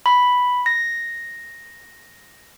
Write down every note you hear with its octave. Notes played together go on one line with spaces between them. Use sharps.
B5
A#6